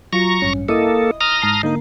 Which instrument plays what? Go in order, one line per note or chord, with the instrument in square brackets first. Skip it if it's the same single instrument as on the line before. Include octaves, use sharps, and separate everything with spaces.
[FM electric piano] F#3 F4 C#7 [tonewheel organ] A#5 C#6
[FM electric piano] A1 G2 C#4
[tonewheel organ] A#3 A4 [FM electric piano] E4 D#5 D#6
[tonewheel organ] A#5 D#6 F6
[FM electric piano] G#2 A5 C7
[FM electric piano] D3 A#3 A#4 [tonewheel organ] D#4